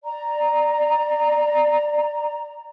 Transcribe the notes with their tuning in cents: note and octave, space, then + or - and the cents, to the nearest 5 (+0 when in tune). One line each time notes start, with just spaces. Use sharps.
D5 +15 A#5 +0